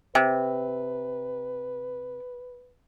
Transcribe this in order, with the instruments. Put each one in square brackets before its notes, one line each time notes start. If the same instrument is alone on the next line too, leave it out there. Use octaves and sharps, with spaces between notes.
[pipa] C3 [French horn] B4